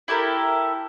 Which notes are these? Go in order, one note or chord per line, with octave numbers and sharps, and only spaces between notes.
E4 G4 A4 A#4